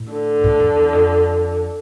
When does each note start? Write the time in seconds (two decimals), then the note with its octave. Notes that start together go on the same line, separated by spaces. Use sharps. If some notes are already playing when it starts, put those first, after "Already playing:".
Already playing: A2
0.12 D3
0.44 A2
0.60 F2
0.76 E2
0.93 F2